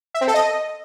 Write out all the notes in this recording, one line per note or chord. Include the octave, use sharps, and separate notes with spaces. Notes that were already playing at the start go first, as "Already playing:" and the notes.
E5
C4
A4
D#5